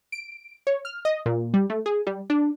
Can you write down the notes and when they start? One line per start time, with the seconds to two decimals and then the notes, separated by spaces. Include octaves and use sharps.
0.12 D7
0.67 C#5
0.85 F6
1.05 D#5
1.26 A#2
1.54 G3
1.70 A3
1.86 G#4
2.07 G3
2.30 D4